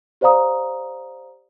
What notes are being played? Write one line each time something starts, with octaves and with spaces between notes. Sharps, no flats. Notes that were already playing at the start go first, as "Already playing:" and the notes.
G4 C5 D5 F5 A#5 D#6